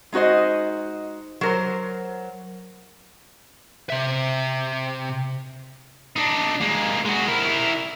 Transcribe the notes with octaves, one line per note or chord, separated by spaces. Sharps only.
G#3 D#4 F#4 C5 D#5
F#3 A#4 C5
C3 E5
D4 D#4
G#3 A#3
G#3 F#4
E4 A#4